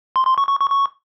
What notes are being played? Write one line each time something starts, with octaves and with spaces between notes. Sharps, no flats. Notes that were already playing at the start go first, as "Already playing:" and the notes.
C6
C6
C#6
C#6
C#6
C#6